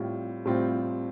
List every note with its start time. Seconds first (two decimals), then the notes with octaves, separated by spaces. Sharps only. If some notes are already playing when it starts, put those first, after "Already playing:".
Already playing: A2 G3 C4 F4
0.45 A2 G3 C4 F4